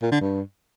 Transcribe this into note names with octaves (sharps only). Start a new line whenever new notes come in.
A#2
D3
G2